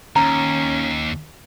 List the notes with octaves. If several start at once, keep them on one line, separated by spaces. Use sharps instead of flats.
D#2 C#4 A#5